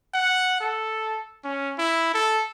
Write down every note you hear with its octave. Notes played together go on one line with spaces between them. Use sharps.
F#5
A4
C#4
E4
A4